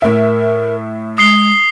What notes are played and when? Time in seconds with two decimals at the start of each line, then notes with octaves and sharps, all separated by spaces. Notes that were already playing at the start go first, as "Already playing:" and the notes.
0.02 A2 A#4 E5
1.18 G#3 D#6 C7 G7